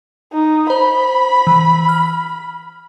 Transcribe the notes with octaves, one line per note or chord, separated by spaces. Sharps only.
D#4
C5 B5
E3
F6